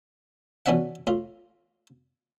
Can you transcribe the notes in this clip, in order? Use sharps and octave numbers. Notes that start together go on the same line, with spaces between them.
B2 E3 C#4 D4 E5 F#5
A2 F4